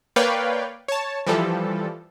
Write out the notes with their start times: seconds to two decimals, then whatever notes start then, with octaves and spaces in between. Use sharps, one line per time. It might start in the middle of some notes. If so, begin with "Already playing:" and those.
0.16 A#3 B4 C#5 D5 F5 G5
0.88 C#5 A5
1.26 E3 F3 G3 A4